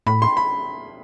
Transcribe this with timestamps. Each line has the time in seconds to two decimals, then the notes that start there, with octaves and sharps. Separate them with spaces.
0.06 A2 B5
0.22 C6
0.37 B5